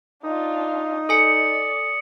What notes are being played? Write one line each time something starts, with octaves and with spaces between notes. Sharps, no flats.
D4 D#4 F4
A4 D5 G#5 D#6 C#7